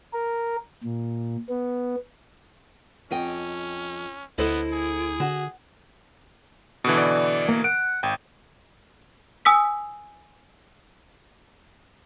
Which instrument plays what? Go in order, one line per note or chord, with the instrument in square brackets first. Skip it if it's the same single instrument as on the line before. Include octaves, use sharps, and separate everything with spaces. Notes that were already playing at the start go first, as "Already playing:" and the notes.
[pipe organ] A#4
A#2
B3
[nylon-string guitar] F2 D#5 G5 [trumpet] C#4
[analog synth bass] D2 [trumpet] B3 [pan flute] E4 [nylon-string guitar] A4 C5 D#5
[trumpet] G#4
[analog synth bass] D3 [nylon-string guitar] F#4
[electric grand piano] B2 D3 E3
[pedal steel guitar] D5
A#3
[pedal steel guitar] F#5 [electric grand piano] D7
[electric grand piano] G#1 G5
[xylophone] G#5 D#6 E6 B6